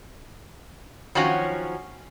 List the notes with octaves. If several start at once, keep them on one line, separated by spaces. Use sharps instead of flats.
D#3 F3 F#3 C#4 F#4